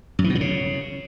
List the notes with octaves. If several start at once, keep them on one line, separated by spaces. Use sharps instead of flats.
F#2
E3
B2
F3
C#3